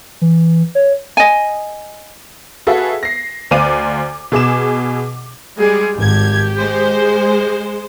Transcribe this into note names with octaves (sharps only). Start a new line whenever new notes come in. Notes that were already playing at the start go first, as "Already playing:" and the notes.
E3
C#5
D#5 G#5
F#4 G#4 A4 B4 E5 F5
A#6 C7
D2 C5 D5 F5 D6 D#7
B2 G#4 D6 E7
G3 G#3 G#4
G#1 G4 G#6
G#3 C5